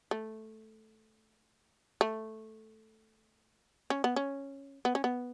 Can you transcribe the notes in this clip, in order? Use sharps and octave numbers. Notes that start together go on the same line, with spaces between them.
A3
A3
C#4
B3
C#4
B3
C#4
B3